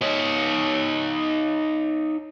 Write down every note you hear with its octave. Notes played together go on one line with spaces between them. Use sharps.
D#4 C#5